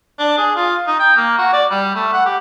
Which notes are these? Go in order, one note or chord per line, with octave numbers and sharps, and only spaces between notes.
D4
G#4
F4
D#4
G5
A#3
F#4
D5
G3
A3
F#5
G4